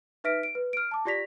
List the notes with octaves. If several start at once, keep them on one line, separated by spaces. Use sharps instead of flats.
D#4 B4 E5 F6 B6 D7
D7
B4
F6 D7
A5 D6
F4 G4 D5 A#6 B6 F7